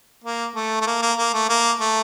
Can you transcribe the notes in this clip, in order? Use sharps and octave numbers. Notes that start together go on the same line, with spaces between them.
A#3
A3
A3
A#3
A#3
A#3
A3
A#3
A3